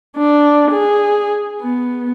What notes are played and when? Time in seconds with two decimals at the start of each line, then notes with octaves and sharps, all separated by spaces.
0.17 D4
0.71 G#4
1.62 B3